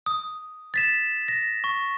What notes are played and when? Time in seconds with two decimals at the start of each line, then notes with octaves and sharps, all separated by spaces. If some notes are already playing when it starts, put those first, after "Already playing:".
0.06 D#6
0.74 A6 B6 E7
1.28 A#6
1.64 C#6